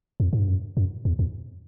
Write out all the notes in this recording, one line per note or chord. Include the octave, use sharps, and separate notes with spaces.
F2
G#2
G2
F#2
F#2
E2
E2